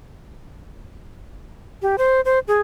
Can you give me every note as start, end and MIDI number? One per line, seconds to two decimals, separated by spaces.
1.82 1.96 67
1.98 2.21 72
2.25 2.39 72
2.48 2.61 68